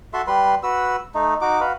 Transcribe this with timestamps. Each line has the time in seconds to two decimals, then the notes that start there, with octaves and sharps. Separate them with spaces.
0.14 F#4 A4 E5 C6
0.27 G3 B4 C6
0.63 F#4 B4 E6
1.15 A3 D#4
1.41 D#4 F#4 D6
1.61 F#4 B4 F5